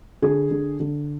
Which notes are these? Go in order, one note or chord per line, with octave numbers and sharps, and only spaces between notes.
D3 G#4
D3
D3